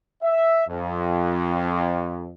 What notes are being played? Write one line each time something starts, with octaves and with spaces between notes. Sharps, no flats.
E5
F2